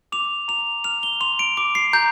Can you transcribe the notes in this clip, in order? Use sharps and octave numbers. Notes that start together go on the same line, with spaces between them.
D6 F7
A#5 F7
F6 F7
G7
C6 F7
D7
D6 D7
C7
A#5 G6